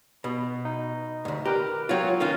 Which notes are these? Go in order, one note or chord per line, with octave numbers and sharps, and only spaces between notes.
B2
D#4
D2 G#2
G4 A#4 B4 A#5
F#3 F4 F#4 C#5 G5
D#3 A#3 C#4 F4